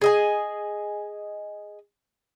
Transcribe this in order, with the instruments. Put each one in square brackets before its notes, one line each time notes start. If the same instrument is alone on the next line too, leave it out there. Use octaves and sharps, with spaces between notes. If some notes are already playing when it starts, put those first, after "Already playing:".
[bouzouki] G#4 D#5 G#5